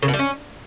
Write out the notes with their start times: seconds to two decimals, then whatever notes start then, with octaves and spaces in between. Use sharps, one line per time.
0.03 C#3
0.08 B2
0.14 G3
0.19 C#4